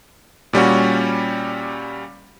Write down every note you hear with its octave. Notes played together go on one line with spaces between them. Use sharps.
A#2 G3 C#4 F#4